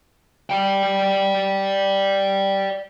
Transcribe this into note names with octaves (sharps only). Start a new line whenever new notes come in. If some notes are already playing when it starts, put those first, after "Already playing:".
D5 G5